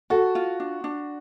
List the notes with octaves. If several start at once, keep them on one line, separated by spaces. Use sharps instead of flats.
F#4 A4
F4
D4
D4